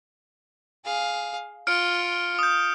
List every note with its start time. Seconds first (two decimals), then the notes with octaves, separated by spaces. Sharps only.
0.85 G#4 F5
1.67 F4 F6 C#7 D7
2.39 D#6 G6